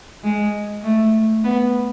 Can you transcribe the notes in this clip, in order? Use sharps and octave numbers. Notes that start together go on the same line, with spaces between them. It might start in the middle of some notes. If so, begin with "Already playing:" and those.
G#3
A3
B3